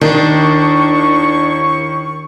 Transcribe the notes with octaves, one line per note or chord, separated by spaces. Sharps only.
D#2 D#3 D4 E4 C#6